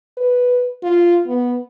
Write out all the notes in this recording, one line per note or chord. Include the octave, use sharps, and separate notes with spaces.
B4
F4
B3